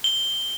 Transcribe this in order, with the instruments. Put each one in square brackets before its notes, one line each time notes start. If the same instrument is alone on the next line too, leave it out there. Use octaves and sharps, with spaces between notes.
[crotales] G7